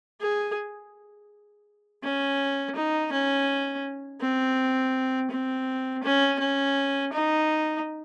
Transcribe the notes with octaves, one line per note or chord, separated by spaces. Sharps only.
G#4
C#4
D#4
C#4
C4
C4
C#4
C#4
D#4